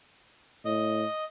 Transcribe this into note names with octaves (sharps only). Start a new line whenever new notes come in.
A2 D#5